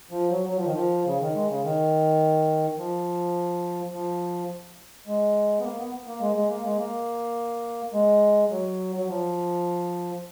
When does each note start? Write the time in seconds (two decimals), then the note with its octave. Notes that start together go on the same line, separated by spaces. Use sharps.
0.11 F3
0.30 F#3
0.49 F#3
0.57 F3
0.65 D#3
0.73 F3
1.06 C#3
1.21 D#3
1.35 G#3
1.49 C#3
1.63 D#3
2.78 F3
3.92 F3
5.07 G#3
5.59 B3
5.64 A#3
5.79 B3
6.07 A#3
6.21 G#3
6.36 G#3
6.49 A#3
6.65 G#3
6.78 A#3
7.93 G#3
8.50 F#3
8.96 F#3
9.08 F3